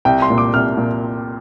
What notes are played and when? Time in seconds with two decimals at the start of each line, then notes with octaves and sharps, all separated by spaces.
0.05 C2 G5
0.22 C6
0.30 A#2
0.38 D6
0.54 C2 F6
0.77 A#2